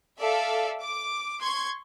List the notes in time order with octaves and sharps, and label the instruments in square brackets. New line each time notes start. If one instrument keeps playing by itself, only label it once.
[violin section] A4 D5 E5 F5
D6
C6 C#6 G#6